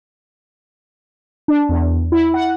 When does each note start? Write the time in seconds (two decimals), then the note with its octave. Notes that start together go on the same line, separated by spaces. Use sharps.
1.48 D4
1.69 E2
2.12 E4
2.34 F#5